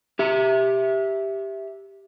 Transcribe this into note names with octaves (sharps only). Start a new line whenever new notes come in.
G4 E5